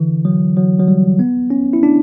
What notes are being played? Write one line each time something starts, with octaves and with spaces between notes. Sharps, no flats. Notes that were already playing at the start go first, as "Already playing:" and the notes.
Already playing: D3 E3
F#3
F#3
F#3
G3
B3
C#4
E4
D4